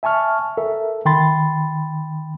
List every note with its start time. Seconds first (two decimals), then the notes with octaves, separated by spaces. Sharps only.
0.03 E5 G#5 A5 C#6 F6
0.57 A4 A#4 E5
1.05 D#3 G5 B5 C6 A6